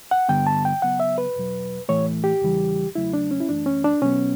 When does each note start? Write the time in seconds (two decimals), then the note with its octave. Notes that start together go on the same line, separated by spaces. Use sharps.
0.11 F#5
0.29 G2 D3 G3 B3 G5
0.47 A5
0.65 G5
0.82 C#3 F#3 B3 F#5
1.00 E5
1.18 B4
1.36 E2 B2 F#3
1.89 A2 E3 A3 C#5
2.24 G4
2.42 E2 C#3 E3 G3
2.95 E2 C#3 F#3 A3 E4
3.13 D4
3.31 C#4
3.40 E4
3.49 F#2 E3 A3 D4
3.66 C#4
3.84 D4
4.01 B2 F#3 B3 C#4